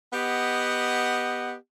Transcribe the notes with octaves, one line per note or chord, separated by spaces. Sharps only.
B3 G4 D#5 F#5